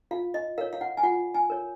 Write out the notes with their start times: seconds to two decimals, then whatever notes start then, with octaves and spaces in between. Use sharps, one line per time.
0.11 F4 F5
0.34 D#5
0.58 A#4 C#5 F5
0.73 F5
0.81 F#5
0.97 G#5
1.03 F4 F#5
1.34 G#5
1.50 A#4 C#5